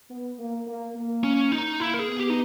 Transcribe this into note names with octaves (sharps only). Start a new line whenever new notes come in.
B3
A#3
A#3
A#3
C#4
D#4
A#3 E4
A#4
G#4
B3
G4
D#4